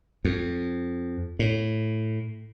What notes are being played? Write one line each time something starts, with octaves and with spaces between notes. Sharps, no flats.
F2
A2